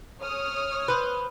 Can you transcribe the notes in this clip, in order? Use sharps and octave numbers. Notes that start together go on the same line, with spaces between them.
C#5 D#6 F6
B4 C5